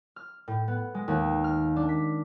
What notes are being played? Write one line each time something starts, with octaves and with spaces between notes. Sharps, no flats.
F6
A2
B3
G#3
D#2
F6
D4
B6